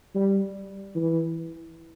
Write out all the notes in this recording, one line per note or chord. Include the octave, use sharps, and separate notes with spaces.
G3
E3